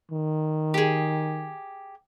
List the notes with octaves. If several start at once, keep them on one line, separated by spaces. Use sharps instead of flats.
D#3
G4 G#4